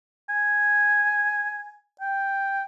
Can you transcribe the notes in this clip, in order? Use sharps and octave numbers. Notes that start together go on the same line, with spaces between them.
G#5
G5